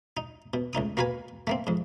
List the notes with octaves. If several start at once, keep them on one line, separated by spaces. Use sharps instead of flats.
D#4
B2
C#2 A2 D#4 D#6
A#3 F#4 A#4 B4 G#5
A3 A#3 C4
F2 G#2